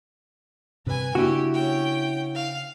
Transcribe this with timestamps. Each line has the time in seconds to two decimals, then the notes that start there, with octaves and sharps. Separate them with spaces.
0.86 G2 C3 B4 G#5
1.15 C#3 A#3 D4 E4 F#4 G4
1.54 C#4 G5
2.35 F5